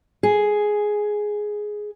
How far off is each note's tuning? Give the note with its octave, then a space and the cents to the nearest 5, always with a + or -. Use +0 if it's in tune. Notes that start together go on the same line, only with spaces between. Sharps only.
G#4 +5